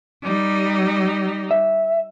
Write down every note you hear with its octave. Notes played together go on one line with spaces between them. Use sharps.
G3 D#4
E5